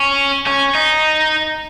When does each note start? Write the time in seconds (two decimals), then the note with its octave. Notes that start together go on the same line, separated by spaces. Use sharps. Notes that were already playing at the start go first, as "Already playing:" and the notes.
Already playing: C#4
0.47 C#4
0.75 D#4